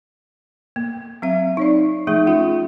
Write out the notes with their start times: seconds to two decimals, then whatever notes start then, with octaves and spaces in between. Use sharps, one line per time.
0.76 A#3
1.22 F#3 C4 E5
1.57 D#4 C#5 D5
2.07 F3 A3 D#4 G#4 E5
2.27 A3 C#4 F4 E5